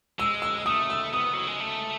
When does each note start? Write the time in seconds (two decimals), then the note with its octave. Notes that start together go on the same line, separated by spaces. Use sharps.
0.19 G#3 E6
0.42 E6
0.66 A3 D#6
0.90 E6
1.13 B3 D#6
1.33 F#3
1.47 G#3
1.60 A3